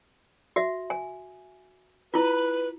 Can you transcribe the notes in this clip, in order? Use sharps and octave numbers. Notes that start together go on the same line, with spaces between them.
F#4 E5
G#5
E4 F4 B4